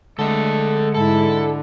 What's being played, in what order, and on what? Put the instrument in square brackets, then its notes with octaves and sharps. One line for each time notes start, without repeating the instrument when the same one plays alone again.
[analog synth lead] D3 [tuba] G#3 [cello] A3 [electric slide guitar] A4 D#5
[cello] G#2 E4 [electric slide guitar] A4